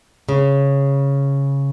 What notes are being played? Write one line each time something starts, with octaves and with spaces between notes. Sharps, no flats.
C#3